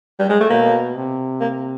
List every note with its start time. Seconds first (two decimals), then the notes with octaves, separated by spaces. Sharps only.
0.20 G3
0.29 G#3
0.40 A3
0.50 B2 A#3
0.95 C3
1.40 A#3